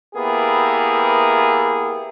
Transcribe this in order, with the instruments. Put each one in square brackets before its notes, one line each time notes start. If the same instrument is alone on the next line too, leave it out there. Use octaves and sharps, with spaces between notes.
[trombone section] A#3 B3 E4 G4 G#4